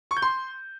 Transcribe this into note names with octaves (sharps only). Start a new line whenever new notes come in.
C#6
G6
C6